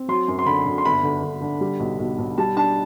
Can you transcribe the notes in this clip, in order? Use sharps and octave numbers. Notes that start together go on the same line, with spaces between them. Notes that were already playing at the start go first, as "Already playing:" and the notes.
Already playing: C4
F#3 C6
F#2
C6
D3 B5
D3
C6
G1 B5
D3
G1
D3
G3
B1
B1
B1
G3 A5
D4 A5